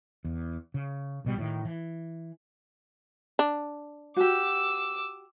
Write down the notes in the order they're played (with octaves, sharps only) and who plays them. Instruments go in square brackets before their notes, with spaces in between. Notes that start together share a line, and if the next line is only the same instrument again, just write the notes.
[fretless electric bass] E2
C#3
A1 B2 G3
A2 D#3
E3
[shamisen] D4
[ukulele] F#4 G4 [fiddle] D6 E6